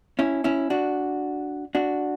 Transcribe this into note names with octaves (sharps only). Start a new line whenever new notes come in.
C#4 E4
C#4 E4
D4 F#4
D4 F#4